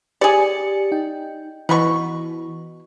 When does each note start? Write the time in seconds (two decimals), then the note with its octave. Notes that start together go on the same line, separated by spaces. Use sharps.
0.21 G4 G#4 D5 A6 C#7
0.92 D#4 G5
1.69 B2 E3 B5 C#6